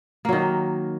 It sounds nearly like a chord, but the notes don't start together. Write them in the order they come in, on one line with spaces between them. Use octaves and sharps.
A#3 F#3 D#3